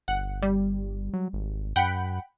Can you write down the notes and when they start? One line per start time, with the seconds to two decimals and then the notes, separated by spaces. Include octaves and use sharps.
0.08 G1 F#5
0.42 G3
1.14 F#3
1.33 G#1
1.76 F#2 F#5 G5 B5